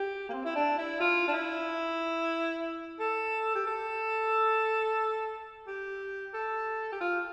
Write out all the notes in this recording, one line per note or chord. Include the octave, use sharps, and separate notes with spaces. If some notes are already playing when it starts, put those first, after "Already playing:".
Already playing: G4
A#3
C4
E4
D4
E4
F4
D4
E4
A4
G4
A4
G4
A4
G4
F4